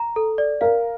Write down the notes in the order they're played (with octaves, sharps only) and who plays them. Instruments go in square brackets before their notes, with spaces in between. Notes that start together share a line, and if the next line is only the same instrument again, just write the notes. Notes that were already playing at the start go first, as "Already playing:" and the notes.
Already playing: [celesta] A#5
A4
D5
[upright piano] A#4 [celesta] F5